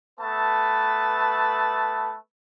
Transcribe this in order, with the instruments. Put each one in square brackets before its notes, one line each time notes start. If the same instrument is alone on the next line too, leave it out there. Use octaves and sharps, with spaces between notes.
[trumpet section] A3 B3 B4 A5